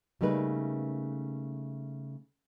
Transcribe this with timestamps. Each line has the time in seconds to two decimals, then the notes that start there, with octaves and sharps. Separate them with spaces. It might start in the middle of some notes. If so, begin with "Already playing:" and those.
0.21 C#3 G3 A3 A#3 D#4 B4